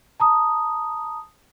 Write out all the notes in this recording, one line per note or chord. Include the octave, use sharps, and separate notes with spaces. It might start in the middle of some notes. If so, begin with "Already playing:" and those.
A5 A#5 D#6